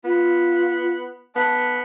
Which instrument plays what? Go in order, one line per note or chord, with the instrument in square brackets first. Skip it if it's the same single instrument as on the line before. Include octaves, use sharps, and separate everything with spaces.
[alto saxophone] B3 [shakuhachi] F4
[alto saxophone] B3 [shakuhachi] A5